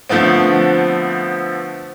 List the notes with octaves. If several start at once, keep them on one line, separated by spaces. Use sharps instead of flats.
D3 F3 A3 B3 C4